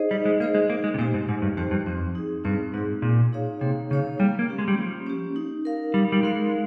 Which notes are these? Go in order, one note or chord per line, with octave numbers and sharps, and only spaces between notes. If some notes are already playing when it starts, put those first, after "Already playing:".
Already playing: D#4 G#4 C5 D#5
G3 D#4
G#3
A#3 G#4 C5 D#5
G#3
A#3 D#4
G#3
C3
A#2 G4 C5
G#2
G#2 D#4
G2
F2 G4 C5
G2
F2 C4
D#4 G#4
G2 C4
G#2 D#4 G#4
A#2 A#3
D#4 G#4 C#5 F5
C3 A#3
C#3 D#4 G#4 C#5 F5
G3 A#3
A#3
C#4 G4
G#3
G3
F3 A#3
C#4 G4
D#4
A#4 F5
G3 D#4
G3
G#3 A#4 F5